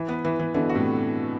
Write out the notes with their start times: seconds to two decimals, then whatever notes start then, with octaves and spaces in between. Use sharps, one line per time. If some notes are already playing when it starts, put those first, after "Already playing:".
Already playing: E3
0.08 B3
0.25 E3
0.39 E3
0.54 B2 D3 E3
0.69 F#4
0.75 A2 C3